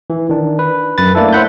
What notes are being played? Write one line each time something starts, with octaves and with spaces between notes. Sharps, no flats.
E3
D#3 D4
B4
F#2 B4 A6
A3 A#3 D4 E4 A4
C5 C#5 E5 F#5 B5 G6